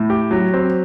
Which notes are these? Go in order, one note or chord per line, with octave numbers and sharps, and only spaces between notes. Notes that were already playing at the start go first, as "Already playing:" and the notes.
Already playing: A2
G4
F#3
C4